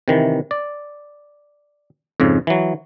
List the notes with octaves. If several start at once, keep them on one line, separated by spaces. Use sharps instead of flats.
C3 D#3 E3
D5
F2 G#2 C#3
E3 F#3